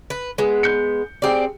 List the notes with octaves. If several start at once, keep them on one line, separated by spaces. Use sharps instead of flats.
B4
G#3 B3
G6 C#7
C4 G4 G#4 D5 G5